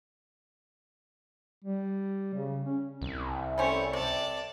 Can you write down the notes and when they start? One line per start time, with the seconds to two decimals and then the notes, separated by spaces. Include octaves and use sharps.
1.64 G3
2.34 C#3
2.65 C#4
3.02 C2
3.58 G3 A3 C#4 C5 C#5
3.93 C3 D5 A5